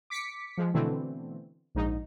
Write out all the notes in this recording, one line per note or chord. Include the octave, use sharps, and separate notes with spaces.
D6 B6 C#7
F3 G#3
B2 D3 E3 A3 C4
A#1 G#2 D#4